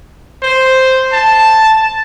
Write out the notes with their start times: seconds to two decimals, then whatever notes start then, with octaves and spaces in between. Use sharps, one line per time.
0.43 C5
1.13 A5